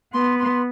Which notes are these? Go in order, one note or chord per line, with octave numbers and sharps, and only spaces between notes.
B3 C6
C6